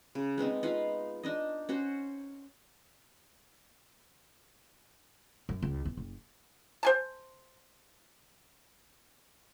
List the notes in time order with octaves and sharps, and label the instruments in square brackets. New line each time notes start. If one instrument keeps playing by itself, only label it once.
[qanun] C#3
G#3 B3 C4 D#4
D#4 F4 B4 F5
D4 D#4 D#5
C#4 F#4 C5
[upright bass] F#2
C#2
E2
F#1
[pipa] C5 G#5 A5